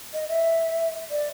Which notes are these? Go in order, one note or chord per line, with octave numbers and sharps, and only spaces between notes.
D#5
E5
D5